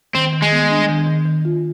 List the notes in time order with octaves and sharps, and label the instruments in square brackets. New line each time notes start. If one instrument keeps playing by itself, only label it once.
[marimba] D#3 [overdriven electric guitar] C4
[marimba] D#3
[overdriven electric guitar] G#3
[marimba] B3
D4
D#3
D#3
D#3
F4